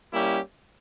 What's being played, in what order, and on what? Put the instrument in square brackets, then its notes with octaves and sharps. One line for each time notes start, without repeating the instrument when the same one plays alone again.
[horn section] G3 A#3 C#4 E4 G4